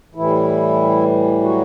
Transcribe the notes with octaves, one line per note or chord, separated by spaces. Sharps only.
A2 E3 G3 E4
F#3 F#4